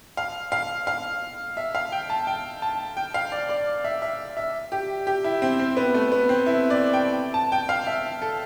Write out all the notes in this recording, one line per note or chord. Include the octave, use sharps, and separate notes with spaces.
F5
F5
F5
E5
F5
G5
A5
G5
A5
G5
F5
D5
D5
E5
E5
E5
G4
G4
E4
C4
C4
B3
A3
B3
C4
E4
D5
G5
A5
G5
F5
E5
A4